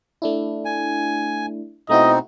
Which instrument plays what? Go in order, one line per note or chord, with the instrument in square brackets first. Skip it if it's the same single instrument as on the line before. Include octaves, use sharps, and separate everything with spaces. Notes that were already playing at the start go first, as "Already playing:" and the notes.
[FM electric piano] A3 D4 E4
[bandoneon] G#5
[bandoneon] B2 C4 D#4 [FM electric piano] A3 E4 F#4 [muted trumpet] D#5